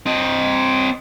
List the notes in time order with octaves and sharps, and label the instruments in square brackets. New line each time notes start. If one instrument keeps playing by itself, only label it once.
[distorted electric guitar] C4 D#5